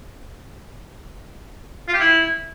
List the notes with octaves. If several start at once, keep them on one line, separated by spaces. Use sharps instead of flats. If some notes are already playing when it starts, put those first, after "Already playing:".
F4
G4
E4